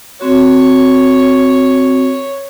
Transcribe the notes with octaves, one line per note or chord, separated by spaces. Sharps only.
C4 F#4 C#5